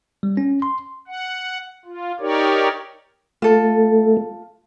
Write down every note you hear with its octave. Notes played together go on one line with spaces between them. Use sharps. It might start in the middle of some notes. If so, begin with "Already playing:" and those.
G3
C#4
C6
F#5
F4
D#4 G4 A#4 C#5 D5
A3 F4 A4